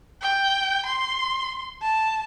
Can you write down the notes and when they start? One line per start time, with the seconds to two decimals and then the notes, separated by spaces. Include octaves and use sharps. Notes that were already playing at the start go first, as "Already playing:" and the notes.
0.21 G5
0.86 C6
1.82 A5